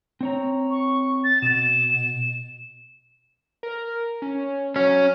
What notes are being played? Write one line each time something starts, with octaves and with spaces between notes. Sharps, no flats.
C4 C#5 A#5
C#6
A6
B2 E7
A#4
C#4
F#3 C#4